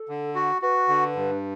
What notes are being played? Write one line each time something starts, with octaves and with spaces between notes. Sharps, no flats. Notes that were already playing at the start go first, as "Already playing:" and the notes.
Already playing: A4
D3
F#4
F#4 B4
D3
G2